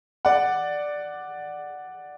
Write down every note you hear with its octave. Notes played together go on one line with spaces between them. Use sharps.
D5 F#5